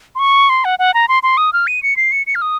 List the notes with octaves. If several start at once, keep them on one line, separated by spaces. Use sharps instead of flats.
C6
C#6
C6
F#5
F#5
A#5
C6
C6
D#6
F6
D#7
C#7
C7
C#7
C#7
F6
D#6